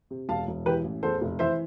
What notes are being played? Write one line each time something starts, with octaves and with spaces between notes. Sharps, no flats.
C3
E1 F5 A5
E1
E3 G4 B4
A1
E2 A4 C5
F1
E3 C5 E5